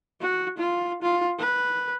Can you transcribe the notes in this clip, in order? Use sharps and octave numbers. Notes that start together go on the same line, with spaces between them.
F#4
F4
F4
B4